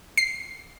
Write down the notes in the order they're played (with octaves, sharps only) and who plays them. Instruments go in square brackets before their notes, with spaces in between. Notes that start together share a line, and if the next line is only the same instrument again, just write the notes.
[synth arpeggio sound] C7